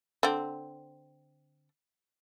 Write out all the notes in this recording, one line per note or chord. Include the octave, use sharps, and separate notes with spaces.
D3 C4